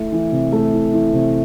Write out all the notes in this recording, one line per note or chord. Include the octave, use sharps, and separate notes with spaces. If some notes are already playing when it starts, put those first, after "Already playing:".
Already playing: A3 E4
E3
C3
A3
E4
E3
C3